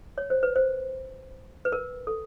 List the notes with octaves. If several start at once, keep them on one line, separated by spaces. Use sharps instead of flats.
C#5
C5
B4
C5
B4
A#4
A4